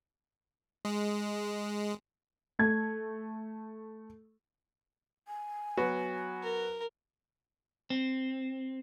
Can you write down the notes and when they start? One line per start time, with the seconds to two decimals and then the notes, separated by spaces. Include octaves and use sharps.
0.85 G#3
2.59 A3 G#6
5.28 G#5
5.77 F#3 B3 F#4
6.43 A#4
7.90 C4